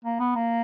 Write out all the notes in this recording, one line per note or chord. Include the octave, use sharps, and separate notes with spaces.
A#3
B3
A#3